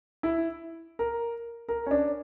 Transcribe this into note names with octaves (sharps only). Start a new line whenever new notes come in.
E4
A#4
A#4
C#4
D4